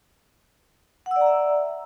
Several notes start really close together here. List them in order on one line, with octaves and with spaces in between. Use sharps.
F#5 E6 D5 A#5 E5